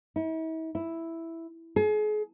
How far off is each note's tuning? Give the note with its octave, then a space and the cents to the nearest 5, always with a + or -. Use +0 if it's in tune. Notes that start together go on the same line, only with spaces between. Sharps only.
E4 -45
E4 +0
G#4 +35